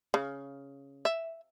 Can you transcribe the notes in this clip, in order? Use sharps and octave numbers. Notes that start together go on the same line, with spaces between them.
C#3
E5